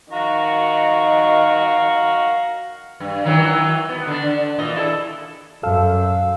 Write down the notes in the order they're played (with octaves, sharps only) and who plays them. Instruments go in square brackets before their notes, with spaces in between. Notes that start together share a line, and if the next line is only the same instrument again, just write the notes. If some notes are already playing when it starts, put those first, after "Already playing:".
[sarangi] D#3 [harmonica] F#4 A#5 C#6 [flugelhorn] F5
[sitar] G2
D#3 E3 F#3
B3
D3 D4
A#2 E3 D#5
E4 G#4 A4
[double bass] F#2 [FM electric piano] A4 F5 E6